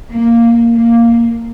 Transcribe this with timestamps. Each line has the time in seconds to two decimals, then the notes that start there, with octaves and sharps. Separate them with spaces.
0.12 A#3
0.74 A#3